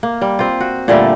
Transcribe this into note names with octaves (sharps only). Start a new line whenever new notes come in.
A#3
G3
C4 F4
F#4
A#2 D3 G3 A3